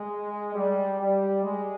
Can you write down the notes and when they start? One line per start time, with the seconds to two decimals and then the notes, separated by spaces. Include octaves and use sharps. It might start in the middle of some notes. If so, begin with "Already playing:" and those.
Already playing: G#3
0.55 G3
0.99 G3
1.43 G#3